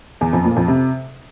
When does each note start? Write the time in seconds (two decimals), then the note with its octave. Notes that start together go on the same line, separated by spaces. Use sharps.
0.21 E2
0.33 F2
0.45 A#2
0.56 F2
0.68 C3